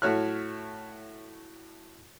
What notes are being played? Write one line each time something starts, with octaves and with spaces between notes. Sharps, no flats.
A2 A3 F#4 C#5 F6 F#6